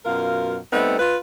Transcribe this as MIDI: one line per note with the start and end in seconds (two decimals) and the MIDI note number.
0.05 0.57 42
0.05 0.57 47
0.05 0.57 65
0.05 0.57 70
0.05 0.57 77
0.72 0.98 55
0.72 0.98 57
0.72 0.98 59
0.72 0.98 60
0.72 0.98 63
0.99 1.17 65
0.99 1.17 71